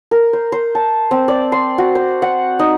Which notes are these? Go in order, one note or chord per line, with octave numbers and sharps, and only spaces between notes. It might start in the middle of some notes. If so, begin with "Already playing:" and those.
A#4
C5
C5
A5
C4
D5
C6
F#4
C5
F#5
D#4